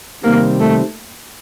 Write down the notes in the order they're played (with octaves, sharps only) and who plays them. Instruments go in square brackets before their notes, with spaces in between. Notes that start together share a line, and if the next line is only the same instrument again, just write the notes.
[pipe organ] C3 D#3 G3 C4 [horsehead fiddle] A#3
[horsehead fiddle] A3